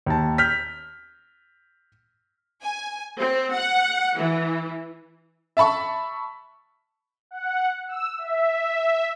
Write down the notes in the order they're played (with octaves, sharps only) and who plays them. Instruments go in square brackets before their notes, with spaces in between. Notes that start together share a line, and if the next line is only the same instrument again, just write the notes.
[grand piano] D#2 A5
F6 G6 B6
[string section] G#5
C4
F#5
E3
[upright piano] E5 A5 B5 C#6
[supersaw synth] F#5
E6
E5
E5